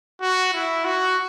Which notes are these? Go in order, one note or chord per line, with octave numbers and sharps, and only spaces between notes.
F#4
E4
F#4